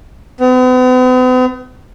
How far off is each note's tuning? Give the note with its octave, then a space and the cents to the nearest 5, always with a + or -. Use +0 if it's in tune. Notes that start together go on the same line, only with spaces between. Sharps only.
B3 +45